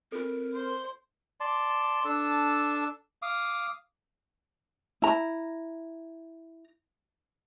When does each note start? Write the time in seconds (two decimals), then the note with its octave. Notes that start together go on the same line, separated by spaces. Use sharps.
0.12 C4 F4 A4 A#4
0.54 C5
1.40 D5 A5 C6
2.05 D4 A4 A5
3.22 F5 D6 D#6
5.02 E4 A#5